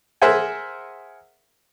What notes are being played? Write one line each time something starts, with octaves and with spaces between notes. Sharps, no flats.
G#4 A#4 C5 E5 F#5 G#5